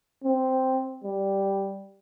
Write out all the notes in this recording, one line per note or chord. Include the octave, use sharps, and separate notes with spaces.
C4
G3